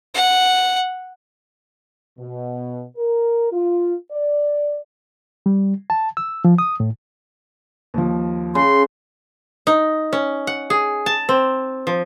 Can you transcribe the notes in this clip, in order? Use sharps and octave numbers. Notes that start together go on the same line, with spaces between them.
F#5
B2
A#4
F4
D5
G3
A5
E6
F3
D#6
A2
D#2 F3
C#3 C6
D#4
C#4
F#5
G#4
A5
C4
F3